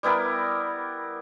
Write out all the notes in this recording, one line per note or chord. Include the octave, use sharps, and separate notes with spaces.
G3 B3 E4 A#4